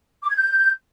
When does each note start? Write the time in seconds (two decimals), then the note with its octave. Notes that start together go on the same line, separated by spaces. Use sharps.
0.22 D6
0.29 G#6
0.36 G6